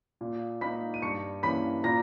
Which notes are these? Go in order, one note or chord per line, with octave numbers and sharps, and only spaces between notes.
A#2
A#3 D#4 B5 B6
D#7
G2 C#6 C#7
E3 A#3 C#4 B5 B6
A#2 A#5 A#6